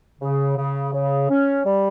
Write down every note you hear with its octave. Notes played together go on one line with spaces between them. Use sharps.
C#3
C#3
C#3
C#4
G3